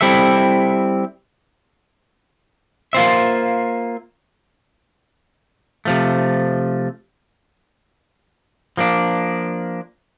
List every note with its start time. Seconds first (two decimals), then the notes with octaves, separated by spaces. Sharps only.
0.01 G3 C4 E4 A4 E5
2.93 A#3 F4 C5 E5
5.85 C3 F3 A3
8.77 F3 A#3 D4